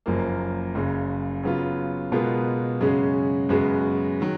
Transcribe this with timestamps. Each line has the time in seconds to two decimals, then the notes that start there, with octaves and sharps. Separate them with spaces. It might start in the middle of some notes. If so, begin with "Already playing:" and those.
0.06 F#1 F#2 F3 A#3
0.75 F#1 F#2 C#3
1.43 C#3 F#3 B3 F4
2.12 B2 G#3 B3 F4 A#4
2.80 F#2 C#3 G#3 C#4 F#4
3.49 F#2 C#3 G#3 B3 F#4
4.21 D#3 F#3